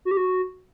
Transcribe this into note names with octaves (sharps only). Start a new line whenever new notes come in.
F#4
G4
F#4